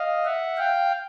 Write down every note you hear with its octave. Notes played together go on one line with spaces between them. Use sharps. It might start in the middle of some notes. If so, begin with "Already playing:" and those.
Already playing: D#5 F5
E5 F#5
F5 G5